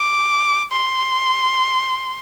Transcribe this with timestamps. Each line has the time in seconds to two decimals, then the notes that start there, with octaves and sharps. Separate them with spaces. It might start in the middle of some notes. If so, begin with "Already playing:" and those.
Already playing: D6
0.72 C6